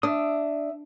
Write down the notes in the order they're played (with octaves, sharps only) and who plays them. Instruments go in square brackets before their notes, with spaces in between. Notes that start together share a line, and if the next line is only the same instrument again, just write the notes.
[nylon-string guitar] D4 [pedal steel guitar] E5 D#6